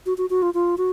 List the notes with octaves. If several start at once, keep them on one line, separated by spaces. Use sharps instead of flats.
F#4
F#4
F#4
F4
F4
F#4